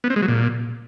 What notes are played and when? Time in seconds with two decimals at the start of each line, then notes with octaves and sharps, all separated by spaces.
0.04 B3
0.10 C4
0.16 G#3
0.22 F#3
0.28 A#2